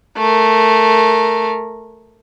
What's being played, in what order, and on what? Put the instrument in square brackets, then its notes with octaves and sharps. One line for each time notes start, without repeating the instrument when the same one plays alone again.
[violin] A3 A#4